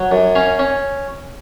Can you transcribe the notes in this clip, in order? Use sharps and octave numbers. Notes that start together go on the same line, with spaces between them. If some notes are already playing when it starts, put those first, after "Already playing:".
Already playing: F#3
F#2
C#4 F5
C#4